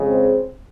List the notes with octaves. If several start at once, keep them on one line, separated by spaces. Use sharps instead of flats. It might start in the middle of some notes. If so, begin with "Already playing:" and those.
Already playing: F2 C#3 G#3
C4